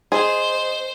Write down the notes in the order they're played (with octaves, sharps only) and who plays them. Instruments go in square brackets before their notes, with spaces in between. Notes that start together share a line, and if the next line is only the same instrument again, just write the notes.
[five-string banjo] G#4 [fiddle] C5 [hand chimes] D#5 C6